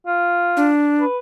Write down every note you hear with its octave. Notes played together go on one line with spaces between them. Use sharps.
F4
D4
B4